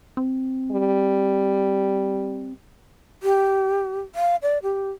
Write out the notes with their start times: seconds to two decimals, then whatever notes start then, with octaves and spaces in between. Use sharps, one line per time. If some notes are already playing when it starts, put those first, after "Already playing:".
0.17 C4
0.71 G3
3.23 G4
4.15 F5
4.42 D5
4.63 G4